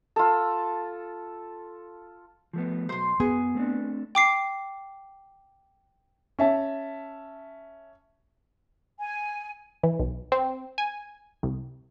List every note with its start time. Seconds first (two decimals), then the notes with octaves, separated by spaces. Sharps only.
0.16 F4 A4
2.53 F3 A3 B3
2.89 B1 F#3 C5 C6
3.20 F#2 B3 G#4
3.55 A3 C4 D4
4.15 G5 D6 C7
6.39 C#4 E5 A5
9.00 G#5
9.83 E3
9.99 B1
10.32 C4
10.78 G#5
11.43 C2